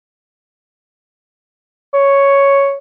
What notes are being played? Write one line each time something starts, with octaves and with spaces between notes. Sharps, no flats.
C#5